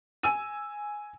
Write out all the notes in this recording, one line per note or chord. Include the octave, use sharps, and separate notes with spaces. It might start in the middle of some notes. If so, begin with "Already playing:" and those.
G#5 E6 D#7